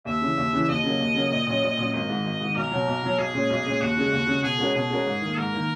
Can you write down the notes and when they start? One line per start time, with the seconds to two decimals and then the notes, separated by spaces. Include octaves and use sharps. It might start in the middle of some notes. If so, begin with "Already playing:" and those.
0.05 D#2 E5
0.22 C#3 E3
0.37 D#2
0.53 C#3 E3
0.69 D#2 D#5
0.83 C#3 F#3 A#3
1.00 D#2
1.15 C#3 F#3 A#3
1.31 A#1
1.46 A#2 F#3 C#4
1.62 A#1
1.77 A#2 F#3 C#4
1.93 G#1 D#5
2.09 G#2 D#3
2.24 G#1
2.41 G#2 D#3
2.56 B1 A#4
2.71 B2 F#3
2.87 B1
3.02 B2 F#3
3.18 B1 G#4
3.34 A#2 G#3 C#4
3.50 B1
3.65 A#2 G#3 C#4
3.81 D#2 F#4
3.97 C#3 G#3
4.12 D#2
4.27 C#3 G#3
4.43 B2 G#4
4.59 G#3 C#4 F#4 A#4
4.75 B2 G#4
4.90 G#3 C#4 F#4 A#4
5.06 G#2
5.21 D#3 A#3
5.37 G#2 A#4
5.52 D#3 A#3